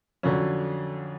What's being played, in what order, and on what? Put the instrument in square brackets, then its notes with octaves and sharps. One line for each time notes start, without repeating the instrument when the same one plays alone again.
[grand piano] F2 D3 F#3 C#4